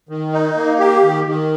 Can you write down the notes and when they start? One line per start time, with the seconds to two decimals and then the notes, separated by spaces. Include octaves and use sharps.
0.09 D#3
0.33 D#4
0.56 A#3
0.79 G4
1.03 D#3
1.27 D#3